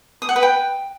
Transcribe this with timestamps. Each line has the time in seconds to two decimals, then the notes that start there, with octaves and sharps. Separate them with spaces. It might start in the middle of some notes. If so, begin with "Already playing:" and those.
0.22 D#6
0.29 F#5
0.36 B4
0.43 G5